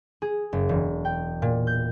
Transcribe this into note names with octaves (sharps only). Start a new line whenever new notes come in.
G#4
F#1
E1
G5
A#2
G6